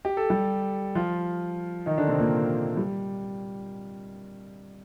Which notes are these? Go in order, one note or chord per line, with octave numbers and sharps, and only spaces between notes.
G4
A4
G3 G4
F3 F4
D#3 D#4
D3 D4
C3 C4
A#2 A#3
G3